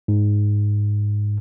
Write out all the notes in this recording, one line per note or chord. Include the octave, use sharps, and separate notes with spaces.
G#2